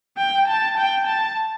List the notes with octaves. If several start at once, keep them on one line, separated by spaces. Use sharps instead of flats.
G5
A5
G5
A5